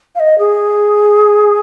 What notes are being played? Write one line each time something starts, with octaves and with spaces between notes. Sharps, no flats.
F5
D#5
G#4